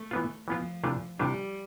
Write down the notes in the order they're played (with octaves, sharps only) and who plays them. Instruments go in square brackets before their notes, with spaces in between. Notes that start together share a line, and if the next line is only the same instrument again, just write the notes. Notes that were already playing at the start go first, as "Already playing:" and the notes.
Already playing: [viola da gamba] A3
[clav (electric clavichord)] E3 B3 F4
[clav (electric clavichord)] E3 B3 F4 [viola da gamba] F3
[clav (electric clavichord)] C3 E3 A3 D4 F4
[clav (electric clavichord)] C3 E3 A3 D4 F4 [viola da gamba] G3